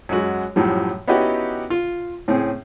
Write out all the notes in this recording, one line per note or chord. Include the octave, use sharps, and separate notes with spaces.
F#2 G#3 F#4
F#2 A2 F3 G3
B3 C#4 D#4 E4 F#4 G4
F4
A2 C4 C#4 G#4